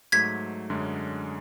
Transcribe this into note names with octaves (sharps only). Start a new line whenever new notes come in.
G#2 F#3 A3 G#6 B6
F#2 D3 G#3 C#4